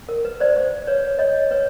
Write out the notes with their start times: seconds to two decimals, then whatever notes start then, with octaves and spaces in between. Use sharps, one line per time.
0.09 A#4
0.25 B4
0.40 C5 D5
0.56 C5 D5
0.87 B4 C#5
1.19 C#5 D#5
1.51 B4 C#5